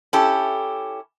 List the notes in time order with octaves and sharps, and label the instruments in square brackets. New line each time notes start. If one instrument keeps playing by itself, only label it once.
[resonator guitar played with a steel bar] C#4 E4 G4 A4